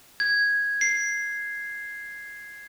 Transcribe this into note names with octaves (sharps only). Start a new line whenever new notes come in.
G#6
C7